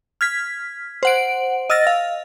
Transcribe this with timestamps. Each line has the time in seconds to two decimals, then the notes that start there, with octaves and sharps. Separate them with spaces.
0.21 F6 G#6 B6
1.03 C5 F#5 D7
1.70 D#5 E6 F6 A6 A#6
1.87 F5